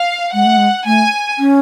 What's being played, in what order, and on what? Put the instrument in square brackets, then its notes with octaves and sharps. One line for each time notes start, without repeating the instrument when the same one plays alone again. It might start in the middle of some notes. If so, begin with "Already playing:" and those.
Already playing: [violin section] F5
[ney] G#3 [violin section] F#5
[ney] A3
G#3
[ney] A3 [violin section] G#5
[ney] C#4